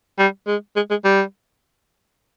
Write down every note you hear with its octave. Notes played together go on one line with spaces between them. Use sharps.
G3
G#3
G#3
G#3
G3